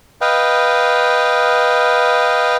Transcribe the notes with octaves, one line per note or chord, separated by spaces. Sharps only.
B4 D#5 F5 G5